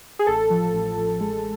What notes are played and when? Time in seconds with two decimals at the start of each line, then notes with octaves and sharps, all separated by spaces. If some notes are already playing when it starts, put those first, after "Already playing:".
0.19 G#4
0.27 A1 A4
0.50 F3
0.74 A1
0.97 A1
1.21 G#3